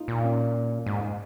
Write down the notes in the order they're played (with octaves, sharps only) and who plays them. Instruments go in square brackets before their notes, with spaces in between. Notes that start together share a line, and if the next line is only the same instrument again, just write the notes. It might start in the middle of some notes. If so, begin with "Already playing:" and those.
Already playing: [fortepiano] D#4 F4
[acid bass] A#2
[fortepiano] C#4
[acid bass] G#2